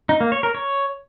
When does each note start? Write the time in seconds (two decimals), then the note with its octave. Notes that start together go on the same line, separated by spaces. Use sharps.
0.09 D#4
0.20 A#3
0.32 C#5
0.43 A#4
0.55 C#5